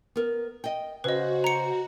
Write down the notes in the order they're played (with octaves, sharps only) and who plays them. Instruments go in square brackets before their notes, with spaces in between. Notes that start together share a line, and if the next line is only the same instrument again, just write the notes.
[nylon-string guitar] B3 A#4
D#5 G5
[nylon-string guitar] C#3 [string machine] F#4 [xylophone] B4 D#5 [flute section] C5
[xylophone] A#5 C#7